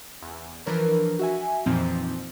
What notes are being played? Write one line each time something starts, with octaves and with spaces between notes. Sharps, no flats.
E2
E3 F3 D4 A#4 B4 C#5
F#4 E5 G#5
F2 A#2 E3 F3 C4 D#4